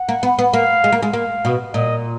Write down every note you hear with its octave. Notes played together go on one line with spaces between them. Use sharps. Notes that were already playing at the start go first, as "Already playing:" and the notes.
Already playing: F#5
A#3
B3
B3
A#3 F5
G#3
A#3
G#3
A#3 F5
B2
A#2 D#5